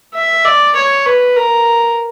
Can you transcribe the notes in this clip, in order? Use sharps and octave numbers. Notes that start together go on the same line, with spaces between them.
E5
D5
C#5
B4
A#4